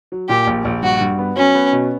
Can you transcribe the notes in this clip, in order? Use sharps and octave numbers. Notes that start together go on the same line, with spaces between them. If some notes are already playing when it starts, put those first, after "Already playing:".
F#3
A#2 G4
A#1
A#1
G2 F#4
G2
B3
F#3 C#4
B3
B2